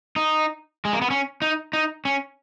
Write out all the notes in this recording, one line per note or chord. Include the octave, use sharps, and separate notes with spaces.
D#4
G#3
A#3
B3
C#4
D#4
D#4
C#4